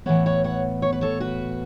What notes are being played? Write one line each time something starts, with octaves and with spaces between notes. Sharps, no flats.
A2 E3 B3 C#5 F#5
C#5 F#5
C#5 F#5
C#5
B4
A4 C#5
F#4 B4